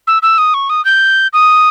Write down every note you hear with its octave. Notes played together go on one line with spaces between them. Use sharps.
E6
E6
D#6
C#6
D#6
G6
D#6